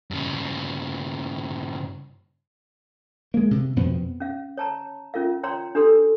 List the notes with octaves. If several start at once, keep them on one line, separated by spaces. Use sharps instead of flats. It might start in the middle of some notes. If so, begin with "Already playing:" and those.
G2 C#3
G#3 A#3
C3
F2 B2 B3 C4
C#4 F5
C#5 A5 A#5
C#4 F4 A#4 F5
C#5 G5 A#5 C6
D4 G4 A4 C6